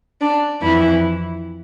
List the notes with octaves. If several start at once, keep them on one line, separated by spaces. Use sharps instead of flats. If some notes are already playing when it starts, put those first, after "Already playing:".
D4
F2 E3 E4